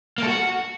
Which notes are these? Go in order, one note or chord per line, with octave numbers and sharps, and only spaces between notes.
A#3
A4
F#4